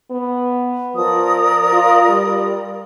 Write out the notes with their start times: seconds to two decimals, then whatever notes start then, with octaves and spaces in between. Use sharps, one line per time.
0.11 B3
0.96 F3 A#4 D5 D#6
1.73 F4
2.08 G3